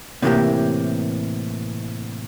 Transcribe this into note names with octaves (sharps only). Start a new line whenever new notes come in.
A2 C3 E3 A3 A#3 G4